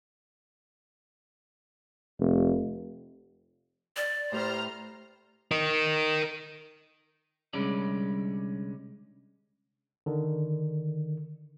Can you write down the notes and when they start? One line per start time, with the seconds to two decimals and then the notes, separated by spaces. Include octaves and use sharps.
2.20 F1
3.96 D5
4.32 A2 G4 B4 C5 A#5 F6
5.51 A#4 D#5
7.53 C2 D3 G3 G#3 C#4 D5
10.06 D3 D#3